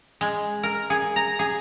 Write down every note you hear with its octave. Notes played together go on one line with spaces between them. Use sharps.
G#3
A#4
G#4
A#5
G#4